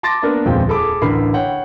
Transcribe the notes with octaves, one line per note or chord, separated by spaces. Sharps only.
A5 C6 D6 A6 A#6
A#3 B3 D4 A#4
D#1 F2 F3 G#3 G5
G#4 A4 B5 D6
A1 D2 D3 A#4 B5 C7
C#5 F#5 G5